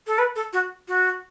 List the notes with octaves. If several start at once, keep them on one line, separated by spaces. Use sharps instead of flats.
A4
B4
A4
F#4
F#4